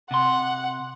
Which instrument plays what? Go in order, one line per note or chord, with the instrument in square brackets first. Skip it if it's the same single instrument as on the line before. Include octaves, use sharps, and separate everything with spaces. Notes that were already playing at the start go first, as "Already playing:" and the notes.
[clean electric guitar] C3 C6 [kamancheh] F#5